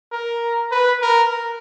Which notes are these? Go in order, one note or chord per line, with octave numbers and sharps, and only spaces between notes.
A#4
B4
A#4